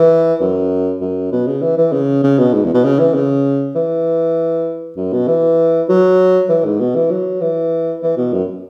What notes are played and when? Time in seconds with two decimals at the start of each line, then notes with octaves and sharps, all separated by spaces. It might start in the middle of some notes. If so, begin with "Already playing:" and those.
Already playing: E3
0.40 F#2
1.01 F#2
1.32 B2
1.47 C#3
1.62 E3
1.77 E3
1.92 C#3
2.23 C#3
2.38 B2
2.54 G#2
2.64 E2
2.74 B2
2.84 C#3
2.99 E3
3.14 C#3
3.75 E3
4.97 F#2
5.13 B2
5.28 E3
5.89 F#3
6.49 E3
6.65 G#2
6.80 B2
6.95 E3
7.11 F#3
7.41 E3
8.02 E3
8.17 B2
8.33 F#2